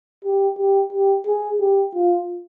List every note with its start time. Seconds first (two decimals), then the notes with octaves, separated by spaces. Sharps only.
0.25 G4
0.59 G4
0.93 G4
1.26 G#4
1.60 G4
1.94 F4